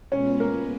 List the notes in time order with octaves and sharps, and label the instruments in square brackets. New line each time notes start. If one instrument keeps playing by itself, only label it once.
[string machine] B2 G#3 B3 F4 B4 [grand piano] C#4 C#5
[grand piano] A#3 A#4